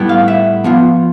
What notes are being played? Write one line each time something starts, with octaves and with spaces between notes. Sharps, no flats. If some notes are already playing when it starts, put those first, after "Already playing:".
Already playing: A2 G3 B3 E4
F5
E5
F3 B3 F4